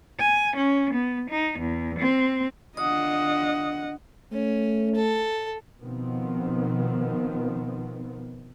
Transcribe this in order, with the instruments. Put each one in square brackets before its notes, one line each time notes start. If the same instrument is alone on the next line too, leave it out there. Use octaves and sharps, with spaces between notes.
[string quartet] G#5
C#4
B3
D#4
E2
C4
[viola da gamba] D3 D4 F4 [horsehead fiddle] D#5 F#5 [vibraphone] D#6
[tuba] A3 [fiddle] C#4
[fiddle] A4
[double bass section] B2 D#3 F3 B3 C4